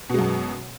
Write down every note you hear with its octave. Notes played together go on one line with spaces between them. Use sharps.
F#2 B2 G#3